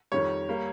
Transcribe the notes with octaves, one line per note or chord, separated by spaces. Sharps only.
F2 D#3 G3 C#5
G3 A#3